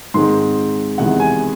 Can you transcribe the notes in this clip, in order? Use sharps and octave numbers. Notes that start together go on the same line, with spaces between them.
G#2 D#3 G#3 C4 C6
E2 C3 D#3 G#3 F#5
G#5